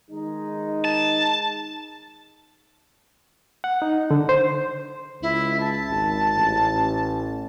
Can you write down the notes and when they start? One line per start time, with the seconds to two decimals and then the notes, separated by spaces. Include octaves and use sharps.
0.11 D#3 G#3 D#4
0.84 A5
3.64 F#5
3.82 D#4
4.11 D3
4.29 C5
5.22 C#2 E4
5.60 A5
5.90 G#1
6.37 A1